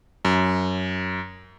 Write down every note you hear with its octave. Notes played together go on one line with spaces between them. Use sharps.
F#2